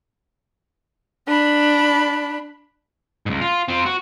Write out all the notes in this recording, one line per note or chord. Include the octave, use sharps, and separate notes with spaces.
D4 B5
C#2 G#2
F4
C4 F4
F#4